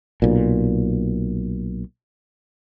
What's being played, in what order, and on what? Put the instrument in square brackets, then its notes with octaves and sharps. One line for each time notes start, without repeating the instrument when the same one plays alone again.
[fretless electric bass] B1 A#2